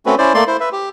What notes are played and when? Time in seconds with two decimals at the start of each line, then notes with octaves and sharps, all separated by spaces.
0.06 A3 C4 C#4 F#4 B4
0.18 C#4 E4 C5 D5
0.34 A3 A#3 D5 C6
0.47 E4 C5
0.60 B4 E5
0.72 G4